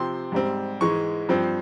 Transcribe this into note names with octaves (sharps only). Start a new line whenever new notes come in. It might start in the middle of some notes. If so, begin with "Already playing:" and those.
Already playing: C3 F3 C4 C6
G#2 G3 C4
G#2 E3 G#3 C#6
G2 F3 C4